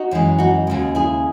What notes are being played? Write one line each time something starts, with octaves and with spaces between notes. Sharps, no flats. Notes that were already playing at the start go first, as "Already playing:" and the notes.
Already playing: D#4 F#4
F#2 E3 G#3
D#4 F#4
D#2 C#3 G#3
E4 G#4